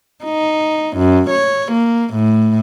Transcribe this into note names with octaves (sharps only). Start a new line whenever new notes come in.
D#4
F#2
C#5
A#3
A2